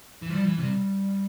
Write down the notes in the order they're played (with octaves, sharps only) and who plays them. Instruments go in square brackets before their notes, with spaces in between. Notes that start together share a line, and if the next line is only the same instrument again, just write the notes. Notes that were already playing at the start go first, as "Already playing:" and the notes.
[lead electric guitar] E3
[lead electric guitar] F3 [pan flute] G3
[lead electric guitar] E3
[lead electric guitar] C3 [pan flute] G3